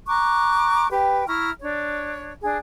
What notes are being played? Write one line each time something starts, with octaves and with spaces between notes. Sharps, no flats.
A#5 C#6 D6 F#6
G4 B4 G5
E4 A#5 C#6 F6
D4 C#5
D4 G#4